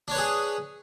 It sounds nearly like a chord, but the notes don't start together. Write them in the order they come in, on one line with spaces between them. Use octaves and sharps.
D4 C#5 B4 G#4